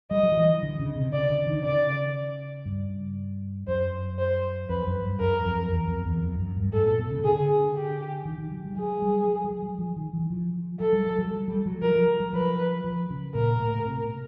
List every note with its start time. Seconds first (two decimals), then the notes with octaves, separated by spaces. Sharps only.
0.11 G3 D#5
0.23 F#3
0.32 F3
0.37 E3
0.63 D3
0.80 C#3
0.96 C3
1.13 C#3 D5
1.30 D3
1.47 D#3
1.64 C#3 D5
2.66 G2
3.68 F#2 C5
4.18 C5
4.69 F2 B4
4.87 F#2
5.04 G2
5.20 F#2 A#4
5.45 F2
5.72 E2
5.88 F2
6.05 E2
6.23 F2
6.39 F#2
6.56 G2
6.73 G#2 A4
6.86 A#2
6.99 B2
7.11 C#3
7.24 D3 G#4
7.75 G4
8.25 D#3
8.38 D#3
8.51 F#3
8.64 G3
8.77 F#3 G#4
9.02 G3
9.28 F#3
9.44 F#3
9.62 F#3
9.79 F3
9.96 D#3
10.13 E3
10.30 F3
10.80 F#3 A4
10.93 G3
11.07 F#3
11.19 F#3
11.31 G3
11.48 G3
11.66 F#3
11.82 F3 A#4
11.96 F3
12.20 F#3
12.33 F3 B4
12.84 F3
13.10 C#3
13.35 A#2 A#4
13.60 A2
13.86 C3
14.04 B2